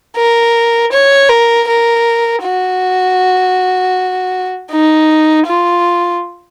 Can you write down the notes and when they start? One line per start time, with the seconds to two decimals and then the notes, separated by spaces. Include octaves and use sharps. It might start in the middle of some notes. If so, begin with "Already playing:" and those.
0.17 A#4
0.92 C#5
1.29 A#4
1.68 A#4
2.43 F#4
4.71 D#4
5.47 F4